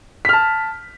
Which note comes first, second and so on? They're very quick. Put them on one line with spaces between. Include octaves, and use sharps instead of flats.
B6 F6 A5